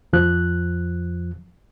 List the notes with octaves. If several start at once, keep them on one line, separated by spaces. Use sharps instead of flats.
F2 F3 F#6